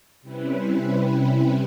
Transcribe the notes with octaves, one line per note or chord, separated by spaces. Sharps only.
C3 G3 C4 C#4 E4 B4